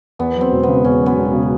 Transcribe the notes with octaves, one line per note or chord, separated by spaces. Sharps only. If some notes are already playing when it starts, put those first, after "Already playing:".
E2 B3
F#3
C4
E1
C#3 B3
E2 C#4
F#3
B3
E1
C#3